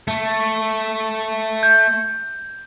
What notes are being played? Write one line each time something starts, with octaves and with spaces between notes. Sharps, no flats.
A3
G6